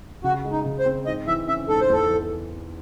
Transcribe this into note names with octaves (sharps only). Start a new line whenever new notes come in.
C#3 F#4
G#3
D#4
C#3
C5
C4
G#2 D#5
E3 E5
C#4 E5
G#2 A4
C5
E2 A4
E3